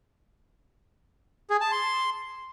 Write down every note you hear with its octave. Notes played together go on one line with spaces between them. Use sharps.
G#4
A5
C6